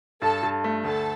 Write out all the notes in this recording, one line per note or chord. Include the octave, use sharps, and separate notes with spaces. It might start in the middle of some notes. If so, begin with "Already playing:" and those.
G2 A4 A5
G2
A3
D2 A4 A5